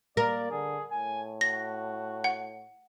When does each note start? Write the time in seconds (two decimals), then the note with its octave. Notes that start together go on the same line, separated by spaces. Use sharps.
0.17 A#3 A#4 D5
0.51 D3 G#4
0.91 A2 G#5
1.41 F#4 A#6
2.24 F#5